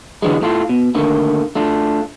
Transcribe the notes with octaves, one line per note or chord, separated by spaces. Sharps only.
D3 E3 F#3 G#3
A2 A3 F4
B2
D3 D#3 A3 A#3
A3 D4 F4